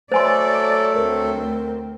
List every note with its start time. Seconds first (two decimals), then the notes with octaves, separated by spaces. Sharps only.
0.12 F#3 A3 A4 C5 D5 G#5 C6 A6
0.96 D2 C4 A#4